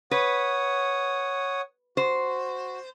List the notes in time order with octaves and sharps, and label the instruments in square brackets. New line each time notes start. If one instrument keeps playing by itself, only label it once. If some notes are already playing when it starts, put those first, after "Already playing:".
[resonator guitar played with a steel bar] B4 [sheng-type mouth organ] C#5 F#5 D#6
[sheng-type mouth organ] F#4 [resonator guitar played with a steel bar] C5